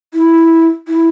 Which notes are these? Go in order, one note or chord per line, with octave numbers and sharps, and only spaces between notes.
E4
E4